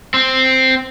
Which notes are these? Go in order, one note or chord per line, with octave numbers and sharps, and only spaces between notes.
C4